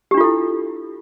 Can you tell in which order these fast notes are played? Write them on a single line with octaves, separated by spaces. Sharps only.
G4 D4 F4 A4 E4